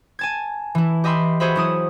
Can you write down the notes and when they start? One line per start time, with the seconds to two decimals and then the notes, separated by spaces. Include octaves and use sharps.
0.19 G#5 A5 G#6
0.75 E3 E4
1.04 G4 D#5 E5 B5 C6
1.40 F#4 G#4 C5 E5 B5
1.56 F#3 E4 D#6